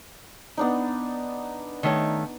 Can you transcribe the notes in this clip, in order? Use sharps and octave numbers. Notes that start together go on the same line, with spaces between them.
B3 D4 D#4
D#3 A3 C#5